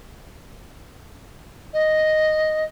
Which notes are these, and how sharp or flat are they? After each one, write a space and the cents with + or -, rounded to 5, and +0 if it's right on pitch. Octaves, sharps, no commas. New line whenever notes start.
D#5 +0